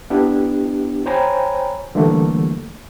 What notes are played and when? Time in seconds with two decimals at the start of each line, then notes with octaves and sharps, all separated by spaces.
0.10 B3 D4 E4 G4
1.06 C5 C#5 G5 G#5 A#5 B5
1.95 D3 E3 F3 G3 A3 A#3